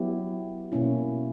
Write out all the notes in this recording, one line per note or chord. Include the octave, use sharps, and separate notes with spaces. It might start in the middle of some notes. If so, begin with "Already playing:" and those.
Already playing: F#3 B3 E4 G4
B2 A#3 C#4 E4